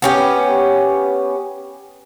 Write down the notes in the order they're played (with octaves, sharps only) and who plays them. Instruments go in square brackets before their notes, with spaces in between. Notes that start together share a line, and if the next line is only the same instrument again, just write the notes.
[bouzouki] B3 C#4 G4